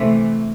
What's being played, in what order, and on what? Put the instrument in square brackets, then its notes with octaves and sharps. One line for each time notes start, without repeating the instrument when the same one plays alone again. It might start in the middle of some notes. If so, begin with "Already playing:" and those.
Already playing: [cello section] C3 E3 A3